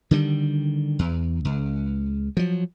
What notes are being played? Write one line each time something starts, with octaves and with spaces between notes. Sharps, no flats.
D3 D#3 G3
E2
C#2
F3 F#3